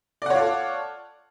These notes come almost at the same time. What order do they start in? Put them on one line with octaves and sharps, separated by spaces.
D5 F#5 C#5 F4 A4